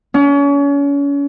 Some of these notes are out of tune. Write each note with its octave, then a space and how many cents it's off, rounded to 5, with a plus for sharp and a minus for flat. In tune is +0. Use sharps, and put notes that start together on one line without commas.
C#4 +35